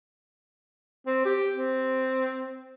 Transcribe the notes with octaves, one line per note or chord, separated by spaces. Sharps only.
C4
G4
C4